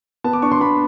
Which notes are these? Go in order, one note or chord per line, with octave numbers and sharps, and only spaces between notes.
B3 A5
D6
D4 C#6
C6
B3 B5